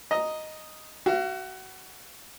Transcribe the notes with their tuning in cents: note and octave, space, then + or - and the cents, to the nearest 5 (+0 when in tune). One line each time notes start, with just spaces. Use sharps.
D#5 +0 A#5 +0
F#4 +25 F5 -35